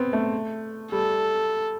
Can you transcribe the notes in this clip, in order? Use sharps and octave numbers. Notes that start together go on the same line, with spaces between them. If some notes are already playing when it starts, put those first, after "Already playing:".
Already playing: B3 C4
A3
G3 A4